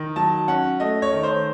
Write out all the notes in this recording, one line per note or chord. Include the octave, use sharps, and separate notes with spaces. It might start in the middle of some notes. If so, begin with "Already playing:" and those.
Already playing: D#3
F#3 A5
C#4 F#5
A3 D#5
C#5
D#3
C5